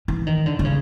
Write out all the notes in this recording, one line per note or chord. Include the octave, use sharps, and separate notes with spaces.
E3
D#3
D3
D3
C#3